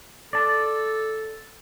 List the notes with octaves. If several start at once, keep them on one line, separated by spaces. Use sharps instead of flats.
A4 D5 A5